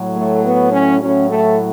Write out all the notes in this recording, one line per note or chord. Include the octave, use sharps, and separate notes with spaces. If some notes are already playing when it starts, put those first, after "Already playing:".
Already playing: A2 F#3
A3
B3
C#4
A2 F#3 C#4
A3